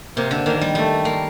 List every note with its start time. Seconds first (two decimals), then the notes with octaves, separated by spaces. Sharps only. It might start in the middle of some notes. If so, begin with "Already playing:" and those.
0.16 C3 A#3
0.31 D3
0.46 D#3 A#3
0.61 G3
0.75 G3 A3
1.05 A#3